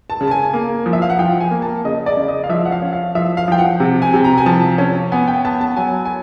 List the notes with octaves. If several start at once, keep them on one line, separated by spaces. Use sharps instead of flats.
A5
C#3
A5
G#5
A#3
F3
E5
F5
F#5
F3 G5
G#5
A#3
A5
C#3 D#5
D5
C#3
D#5
F5
F3 E5
F#5
F5
C#4
F5
F3 E5
F5
F3 G5
F#5
C3
G#5
C3
A#5
G#5
F3 A5
C#4
B3 G#5
G5
B3 A5
A5
F#3 G#5
G#5